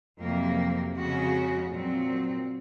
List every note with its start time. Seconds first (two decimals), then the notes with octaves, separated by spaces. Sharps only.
0.20 F2 C3 F#3 A#3
0.95 F2 C#3 G#3 C#4 F#4
1.71 A#2 F#3 C4